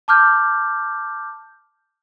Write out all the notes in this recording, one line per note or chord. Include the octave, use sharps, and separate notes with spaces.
A5 D6 F6 G6